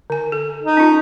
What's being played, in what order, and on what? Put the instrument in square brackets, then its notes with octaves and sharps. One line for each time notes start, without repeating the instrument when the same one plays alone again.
[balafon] D3 G#5
A4
[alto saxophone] D#4
[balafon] C#4 F4